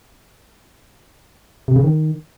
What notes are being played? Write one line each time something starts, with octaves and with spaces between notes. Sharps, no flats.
C3
C#3
D#3